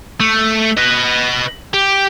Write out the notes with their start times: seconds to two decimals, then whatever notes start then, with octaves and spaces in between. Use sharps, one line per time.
0.20 A3
0.78 B4 D#5
1.74 G4